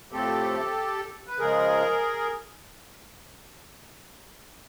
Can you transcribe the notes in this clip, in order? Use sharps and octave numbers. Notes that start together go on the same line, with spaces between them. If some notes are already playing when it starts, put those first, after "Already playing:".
A2 F3 A3 C4 G4 A4
B4
C#3 F3 G#3 G#4 A#4